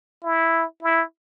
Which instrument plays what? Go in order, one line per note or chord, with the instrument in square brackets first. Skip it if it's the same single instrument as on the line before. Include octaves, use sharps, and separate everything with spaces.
[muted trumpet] E4
E4